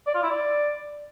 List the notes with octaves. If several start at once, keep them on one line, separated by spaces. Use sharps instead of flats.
D5
F4
E4
D5